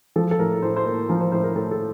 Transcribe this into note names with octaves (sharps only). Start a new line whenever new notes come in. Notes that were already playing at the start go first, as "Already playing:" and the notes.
F3 A4
A4
A2 A#4
A2 C5
C5
A#3
F3 A#4
C5
A2 C5
A#4
A2 A4
A4